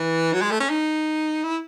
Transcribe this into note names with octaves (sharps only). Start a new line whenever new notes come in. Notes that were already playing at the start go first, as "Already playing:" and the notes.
Already playing: E3
F#3
G#3
A3
C#4
D#4
E4